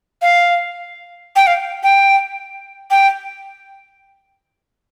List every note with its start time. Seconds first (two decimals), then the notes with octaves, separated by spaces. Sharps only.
0.22 F5
1.36 G5
1.47 F5
1.83 G5
2.91 G5